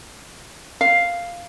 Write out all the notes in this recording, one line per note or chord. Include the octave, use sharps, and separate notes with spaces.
F5